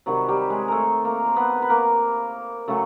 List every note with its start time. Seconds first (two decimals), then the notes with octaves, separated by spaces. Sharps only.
0.06 C3 D#3 F#3 G3 F#4
0.29 G3 G4
0.50 G#3 G#4
0.68 A3 A4 A#4
1.05 A#3 A#4
1.26 C5
1.36 B3 B4
1.62 B4
1.69 A#3 A#4
2.68 C#3 F#3 A3 A4